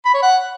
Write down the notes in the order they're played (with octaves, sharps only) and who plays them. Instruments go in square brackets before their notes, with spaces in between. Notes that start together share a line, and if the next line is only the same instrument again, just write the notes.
[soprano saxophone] B5
C#5
F#5